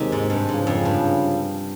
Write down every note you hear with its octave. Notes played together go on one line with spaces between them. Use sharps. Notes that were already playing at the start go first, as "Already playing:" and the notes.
Already playing: D#2 C3 D#3 G#3 D#4
G#2
G2
C#2 G#2 C#3 F3
F2
G2